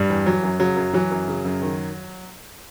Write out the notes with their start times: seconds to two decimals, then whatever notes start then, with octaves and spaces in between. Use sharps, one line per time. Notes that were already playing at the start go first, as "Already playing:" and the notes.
Already playing: G2 G3
0.10 E2
0.26 E3 F#3
0.43 F#2
0.60 C#3 F#3
0.76 F#2
0.93 E3 F#3
1.11 F#2
1.28 C#3
1.45 F#2
1.62 D#3